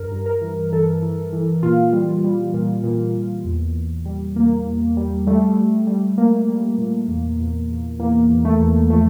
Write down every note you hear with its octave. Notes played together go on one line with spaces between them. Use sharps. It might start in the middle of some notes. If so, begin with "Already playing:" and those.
Already playing: G2 A#4
G2
A#4
E3
E3 A4
E3
E3
A#2 F4
G3
G3
A#2
A#2
A#2
E2
E2
G3
E2 A#3
E2
G3
G3 A3
G3
G3
G3 A#3
G3
A#2
E2
E2
E2
E2 A#3
E2
A3
E2
F3 A3